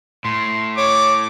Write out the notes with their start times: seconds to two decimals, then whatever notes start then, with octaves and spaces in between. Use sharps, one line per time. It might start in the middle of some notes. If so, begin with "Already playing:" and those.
0.25 A2 C6
0.78 C#5 D6